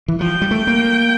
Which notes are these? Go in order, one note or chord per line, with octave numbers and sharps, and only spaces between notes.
E3
F3 G5
G3
A3
A#3